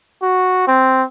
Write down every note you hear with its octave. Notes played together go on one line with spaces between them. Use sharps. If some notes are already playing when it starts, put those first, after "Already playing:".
F#4
C4